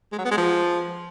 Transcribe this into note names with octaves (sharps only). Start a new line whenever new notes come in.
G#3
F#3
B3
G#3
F3